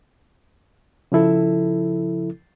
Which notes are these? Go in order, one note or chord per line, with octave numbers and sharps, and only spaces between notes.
C#3 F3 E4 A4